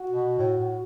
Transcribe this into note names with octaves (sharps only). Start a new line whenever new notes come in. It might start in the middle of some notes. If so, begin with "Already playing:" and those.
Already playing: F#4
B2
A2
A2